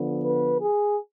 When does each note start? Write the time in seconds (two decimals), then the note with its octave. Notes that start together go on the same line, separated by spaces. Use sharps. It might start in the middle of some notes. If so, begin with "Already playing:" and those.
Already playing: D3 F3 B3
0.23 B4
0.60 G#4